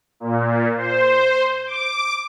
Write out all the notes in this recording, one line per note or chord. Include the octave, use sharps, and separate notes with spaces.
A#2
C5
D6